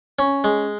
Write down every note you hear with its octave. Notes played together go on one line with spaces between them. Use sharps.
C#4
G#3